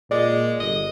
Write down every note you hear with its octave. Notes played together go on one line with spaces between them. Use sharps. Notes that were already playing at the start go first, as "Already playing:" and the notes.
A#2 G#3 D5
G1 D#5